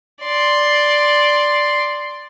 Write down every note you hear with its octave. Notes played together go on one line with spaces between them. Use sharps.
D5 C6